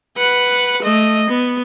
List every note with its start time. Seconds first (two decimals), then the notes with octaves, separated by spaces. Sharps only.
0.18 B4 F#5
0.82 A3 D#5
1.30 B3